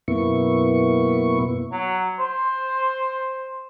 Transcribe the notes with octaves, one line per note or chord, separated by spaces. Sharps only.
F#2 B2 A#3 B3 E4 C#6
F#3
C5